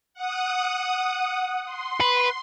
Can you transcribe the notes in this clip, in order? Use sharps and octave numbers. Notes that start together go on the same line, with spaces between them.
F#5 D#6
C6
B4